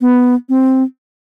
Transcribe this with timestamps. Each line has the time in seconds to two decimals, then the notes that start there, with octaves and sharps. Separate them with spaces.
0.01 B3
0.49 C4